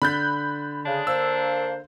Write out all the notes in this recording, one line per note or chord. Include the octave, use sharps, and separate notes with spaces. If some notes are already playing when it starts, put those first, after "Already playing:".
D3 B5 F#6 G6 A6 B6
C#3 D4
A#3 C5 E6